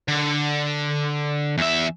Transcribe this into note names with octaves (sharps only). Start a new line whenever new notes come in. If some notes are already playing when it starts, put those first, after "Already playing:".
D3
E2 E5